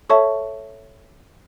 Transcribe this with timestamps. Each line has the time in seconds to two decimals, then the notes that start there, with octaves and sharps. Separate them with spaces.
0.10 A4 C#5 E5 A5 C#6